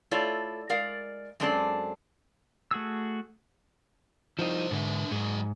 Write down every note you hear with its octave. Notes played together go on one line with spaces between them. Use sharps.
A3 E4 F4 A4 C#5 D5
G#3 A#4 D5 F5
F#2 G#3 C4 D4 A4 D5
A3 F#4 G#4 E6
F3 D#4 E4 G4 C5
G#2 D3 D4 B4 E5
G#2 F#3 G#4